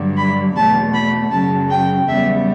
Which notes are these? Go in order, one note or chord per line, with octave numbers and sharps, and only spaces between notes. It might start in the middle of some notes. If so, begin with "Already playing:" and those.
Already playing: G2 D3 F#3
B5
E2 B2 A3 A5
B5
F#2 C#3 F#3 A5
G5
E2 C#3 G3 B3 E5